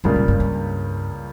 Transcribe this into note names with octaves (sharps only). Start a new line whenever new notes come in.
C#2 G#2 C#3 G3 A#3 F4
A#2
G2
G2